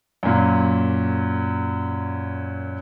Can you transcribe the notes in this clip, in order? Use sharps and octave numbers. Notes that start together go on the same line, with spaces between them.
F#2 A#2